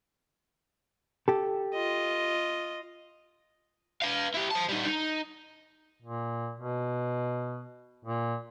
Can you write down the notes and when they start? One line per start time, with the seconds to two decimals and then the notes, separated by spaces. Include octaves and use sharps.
1.28 G4 A4
1.74 F4 D#5
4.02 B4 F5
4.34 E4 G4
4.51 C5 A5
4.69 G3 D#4
4.86 D#4
6.02 A#2
6.58 B2
8.05 A#2